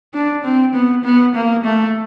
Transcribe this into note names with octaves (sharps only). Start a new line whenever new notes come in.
D4
C4
B3
B3
A#3
A3